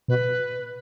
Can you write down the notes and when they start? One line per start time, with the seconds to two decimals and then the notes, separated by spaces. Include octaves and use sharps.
0.08 B2 B4